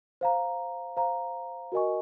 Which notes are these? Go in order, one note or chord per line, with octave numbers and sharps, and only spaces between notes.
C5 F5 A#5
C5 F5 A#5
F#4 A#4 D#5 G#5 C#6